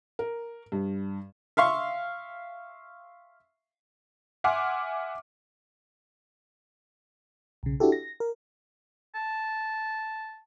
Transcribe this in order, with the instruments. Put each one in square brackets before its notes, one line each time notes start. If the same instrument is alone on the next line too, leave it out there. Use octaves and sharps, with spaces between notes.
[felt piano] A#4
G2
[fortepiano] E5 F5 C6 C#6
[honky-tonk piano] E5 F#5 G#5 C6 D6 F6
[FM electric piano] B1 C#3
D4 E4 F#4 G4 A4
A#6
A#4
[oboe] A5